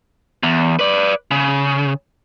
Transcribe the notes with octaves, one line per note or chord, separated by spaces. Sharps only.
E2
B4 D5
C#3